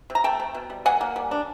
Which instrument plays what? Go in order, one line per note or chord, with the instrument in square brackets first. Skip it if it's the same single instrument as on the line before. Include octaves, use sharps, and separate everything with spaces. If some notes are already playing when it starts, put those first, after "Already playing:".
[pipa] C3
A#5
A3 G5 A5
C3
B2
G3
A#3 F#5 G#5
A#3
G3
D4